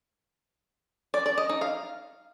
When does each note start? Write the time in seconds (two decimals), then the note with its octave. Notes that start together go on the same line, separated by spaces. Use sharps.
1.14 D5
1.26 D5
1.38 D#5
1.49 D#4
1.61 F5